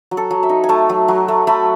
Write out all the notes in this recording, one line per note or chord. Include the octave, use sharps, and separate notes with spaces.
F#3
A4
F#3
E5
D#4
G#5
A3 A5
F#3
F#3
A3
A3 B5